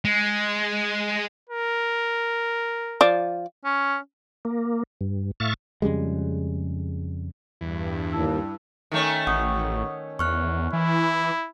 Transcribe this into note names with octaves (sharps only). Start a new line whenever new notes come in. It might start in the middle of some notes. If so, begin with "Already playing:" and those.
G#3
A#4
F3 D5
C#4
A#3
G2
A2 E5 F5 C#6 A6
F2 C#3 G3 G#3
E2 G2
D#2 E4 A5 E6
D#3 A3 C#4
A1 F#5 C#6 D#6
E2 C#6 F6 F#6
E3 E4